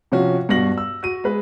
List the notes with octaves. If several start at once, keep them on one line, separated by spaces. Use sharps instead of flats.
C3 F3 C#4 F#4
G2 B2 F#4 A#6 F#7
E6
F#4 D#7
G#3 B4